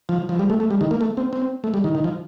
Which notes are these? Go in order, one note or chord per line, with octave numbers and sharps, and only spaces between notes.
F3
F3
G3
A3
A3
G3
D#3
A#3
A3
C4
C4
A3
G3
D#3
D#3
F3